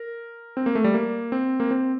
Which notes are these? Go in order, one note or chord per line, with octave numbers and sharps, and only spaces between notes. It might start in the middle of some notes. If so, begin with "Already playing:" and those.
Already playing: A#4
C4
A#3
A3
G3
A#3
C4
A#3
C4